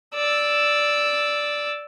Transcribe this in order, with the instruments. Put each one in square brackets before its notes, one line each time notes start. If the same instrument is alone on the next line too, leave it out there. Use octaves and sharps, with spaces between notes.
[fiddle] D5 E6